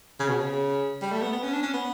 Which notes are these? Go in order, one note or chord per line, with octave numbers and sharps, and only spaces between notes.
C#3
B2
C#3
G3
A3
B3
B3
C#4
D4
C#4
B3